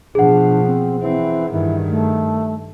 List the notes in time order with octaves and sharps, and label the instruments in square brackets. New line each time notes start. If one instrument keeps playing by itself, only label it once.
[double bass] B2 F3 [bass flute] D4 [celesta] G#4 F#5
[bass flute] C4
[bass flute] E3 [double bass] C4
[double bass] G2 D#3 [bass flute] E3
[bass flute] A3